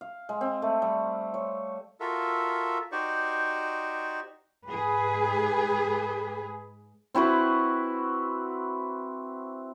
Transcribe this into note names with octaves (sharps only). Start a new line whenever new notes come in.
F5
G#3
C4
A3
G3
C#5
F4 F#4 A4 A#4 E5
D#4 F#4 G4 C5 D5 C#6
G#2 G#4 B4
C4 E4 F#4 B4